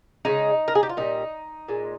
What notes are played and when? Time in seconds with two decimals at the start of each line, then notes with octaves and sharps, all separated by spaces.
0.25 C#3 F3 G#3 D#4
0.68 A#4
0.75 G#4
0.83 G4
0.89 F4
0.97 A#2 G3 D#4
1.69 A#2 G#3